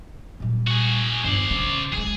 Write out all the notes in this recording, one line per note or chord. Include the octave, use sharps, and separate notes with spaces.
A#2 G3
F#4 G#4
G1 D#2 C5 D5
C#3
C#3 G#3 G#4